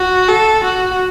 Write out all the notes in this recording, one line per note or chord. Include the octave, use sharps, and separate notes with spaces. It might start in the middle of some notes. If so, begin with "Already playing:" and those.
Already playing: F#4
A4
F#4